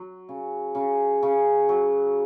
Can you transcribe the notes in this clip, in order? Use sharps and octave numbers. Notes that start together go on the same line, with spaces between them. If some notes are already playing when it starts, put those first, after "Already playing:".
Already playing: F#3
C#3
C#3
C#3
F#3